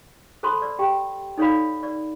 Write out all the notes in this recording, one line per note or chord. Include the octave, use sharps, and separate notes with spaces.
A4 C5 A5 B5 C6
D5
G4 G5
D#4 A4 C#5 D5 F5 B5
D5